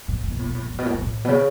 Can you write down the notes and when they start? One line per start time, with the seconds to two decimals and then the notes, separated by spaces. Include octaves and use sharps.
0.08 A2
0.23 A2
0.31 B2
0.39 A2
0.46 B2
0.54 A2
0.62 B2
0.70 A2
0.79 B2
0.86 A2
0.94 B2
1.02 A2
1.25 B2
1.28 C#3